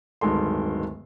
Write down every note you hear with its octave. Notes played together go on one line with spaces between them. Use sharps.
D1 G2 D#3 G#3 A4 C6